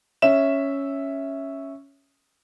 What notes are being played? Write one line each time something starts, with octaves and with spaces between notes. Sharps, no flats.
C#4 E5 E7